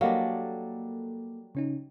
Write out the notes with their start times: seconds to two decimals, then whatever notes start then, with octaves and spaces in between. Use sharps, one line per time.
0.01 F#3 G3 A#3 D4 A4 A#4 D#5 F5
1.55 C#3 C#4 D#4